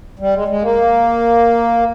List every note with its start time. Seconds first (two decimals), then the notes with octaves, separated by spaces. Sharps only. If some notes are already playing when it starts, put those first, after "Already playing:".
0.19 G3
0.34 G#3
0.48 G#3
0.62 A#3